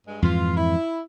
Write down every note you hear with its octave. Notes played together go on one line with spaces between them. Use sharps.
G2 G#3
F2 G#2 E3 F4
E4